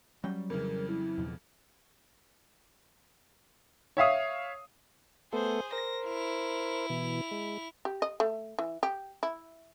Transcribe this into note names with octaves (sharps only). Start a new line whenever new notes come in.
F#3 G3 C#4 G5
F2 C#3 E3 A#4
E4
E2 B2 F3
C#5 E5 F5 D#6
A3 B3 G#4 A4 C5
A#4 C5 A#6
E4 F7
B2 E3
G#3
G4
D#5
A3
E3
G4
E4